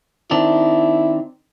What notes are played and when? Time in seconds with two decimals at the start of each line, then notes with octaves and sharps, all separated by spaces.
0.31 D#3 C4 D4 E4